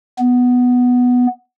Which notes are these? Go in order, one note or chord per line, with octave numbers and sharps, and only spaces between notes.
B3